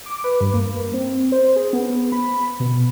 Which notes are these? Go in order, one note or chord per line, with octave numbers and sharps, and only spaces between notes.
D6
B4
G2
A#3
C4
C5
G#4
B3
B5
B2